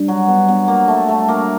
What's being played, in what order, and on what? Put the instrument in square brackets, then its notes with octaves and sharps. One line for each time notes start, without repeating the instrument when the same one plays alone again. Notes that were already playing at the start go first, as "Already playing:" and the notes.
Already playing: [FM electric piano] G3 D4
[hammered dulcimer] F#3
B3
B3
A#3
A3
A3
A#3